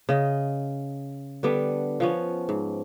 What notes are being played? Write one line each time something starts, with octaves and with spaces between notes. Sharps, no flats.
C#3 D#5
D3 G3 B3 D4
F3 B3 C#4
G#2